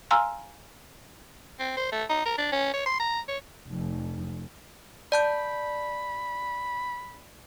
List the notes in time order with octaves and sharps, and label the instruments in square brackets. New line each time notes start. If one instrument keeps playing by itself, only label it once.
[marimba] F5 G#5 A#5 C6 E6 F6
[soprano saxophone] C4
C5
A3
D#4
A#4
D4
C#4
C#5
C6
A#5
C#5
[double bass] F1 F2
[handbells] D5 A5 G6 [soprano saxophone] B5